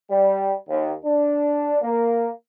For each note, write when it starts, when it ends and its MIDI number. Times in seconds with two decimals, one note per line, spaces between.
0.10 0.53 55
0.68 0.91 39
1.04 1.77 62
1.82 2.28 58